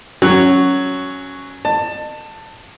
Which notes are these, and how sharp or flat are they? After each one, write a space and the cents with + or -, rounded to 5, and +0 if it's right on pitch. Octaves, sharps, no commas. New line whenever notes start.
F#3 +0 C#4 +0
D#5 -40 A5 +15